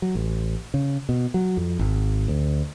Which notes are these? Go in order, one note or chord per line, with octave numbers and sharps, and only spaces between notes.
F#3
A1
C#3
B2
F#3
F2
G#1
D2